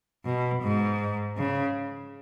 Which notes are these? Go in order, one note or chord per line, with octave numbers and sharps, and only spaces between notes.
B2
G#2
C#3